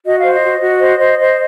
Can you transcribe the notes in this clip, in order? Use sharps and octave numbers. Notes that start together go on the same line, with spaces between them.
F#4 D#5
C5 F5
D#5
F#4
F#4
C5
C5
C5